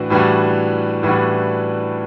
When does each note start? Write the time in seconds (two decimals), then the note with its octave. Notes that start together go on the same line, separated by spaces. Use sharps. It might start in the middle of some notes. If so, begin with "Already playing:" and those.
Already playing: A2 E3 D4 F#4
0.10 A2 E3 G3 D4 F#4
1.03 A2 E3 G3 D4 F#4